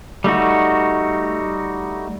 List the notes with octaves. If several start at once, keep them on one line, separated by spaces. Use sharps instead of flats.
G3 A3 D#4 F#4